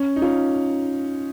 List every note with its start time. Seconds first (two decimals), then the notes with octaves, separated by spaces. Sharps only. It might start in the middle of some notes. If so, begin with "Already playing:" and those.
Already playing: C#4
0.16 D#4
0.22 C#4 F4